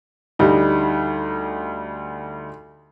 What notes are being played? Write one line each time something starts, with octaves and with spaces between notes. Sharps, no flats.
D2 G3 D#4